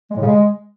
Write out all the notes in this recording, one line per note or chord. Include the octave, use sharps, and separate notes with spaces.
G#3
A2
C#3
G#3